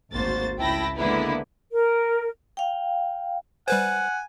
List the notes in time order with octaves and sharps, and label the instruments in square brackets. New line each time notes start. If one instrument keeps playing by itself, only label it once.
[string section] G#1 D2 A#3 F#4 C5 A6
C#2 E4 G5 A5 B5 A#6
D3 G#3 A#3 B3 E4 B4
[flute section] A#4
[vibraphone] F5 G5
[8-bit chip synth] G3 B4 C5 [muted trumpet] F#5 [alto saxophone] G#5